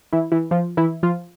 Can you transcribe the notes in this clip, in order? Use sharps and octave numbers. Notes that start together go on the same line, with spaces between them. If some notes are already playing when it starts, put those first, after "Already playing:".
E3 E4
E3 E4
F3 F4
E3 E4
F3 F4